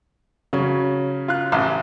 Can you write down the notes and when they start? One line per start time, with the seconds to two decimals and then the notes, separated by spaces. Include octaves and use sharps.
0.53 C#3 F#3 C#4
1.28 F4 F#6
1.52 A1